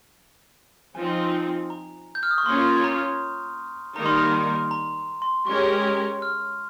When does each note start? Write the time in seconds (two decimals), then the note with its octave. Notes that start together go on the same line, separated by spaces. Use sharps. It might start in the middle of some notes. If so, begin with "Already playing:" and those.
0.95 F3 C4 D#4 G#5
1.70 A#5
2.15 G6
2.23 F6
2.31 D#6
2.38 C#6
2.46 A#3 C#4 F4 C6
2.84 A#5
3.96 D#3 G3 A#3 D#4 A#4 A#5
4.06 C6
4.16 A#5
4.71 A#5
5.22 C6
5.47 G#3 C#4 G4 A#4 C#6
6.22 F6